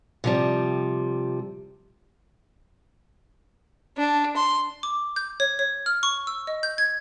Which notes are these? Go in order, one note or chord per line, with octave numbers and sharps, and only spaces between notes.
C3 F3 G3
D4
C6
D6
G6
C#5
C#5
F6
C#6
E6
D#5
G6
G#6